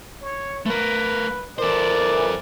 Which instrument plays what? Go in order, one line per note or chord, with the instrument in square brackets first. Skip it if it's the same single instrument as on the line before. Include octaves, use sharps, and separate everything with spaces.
[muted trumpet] C#5
[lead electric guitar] A3 A#4 [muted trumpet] B4
[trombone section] E3 A#4 [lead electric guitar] A4 C5 [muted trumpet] D5